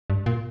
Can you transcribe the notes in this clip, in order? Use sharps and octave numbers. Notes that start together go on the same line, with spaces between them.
G2
A#2